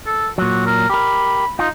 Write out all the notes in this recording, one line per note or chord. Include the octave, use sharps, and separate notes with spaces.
A4
A#2 F#3 F#4
A#4
G4 A#4 B5
D#4 F4